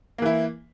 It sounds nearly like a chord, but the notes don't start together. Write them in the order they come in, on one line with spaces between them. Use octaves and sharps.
A#3 E3 E4